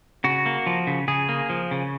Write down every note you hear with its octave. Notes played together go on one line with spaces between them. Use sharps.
C#3 F#4
A#3
F3
C#3
C#3 G#4
A#3
F3
C#3